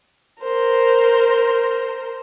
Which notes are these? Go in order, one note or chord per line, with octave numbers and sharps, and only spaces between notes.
A#4 C5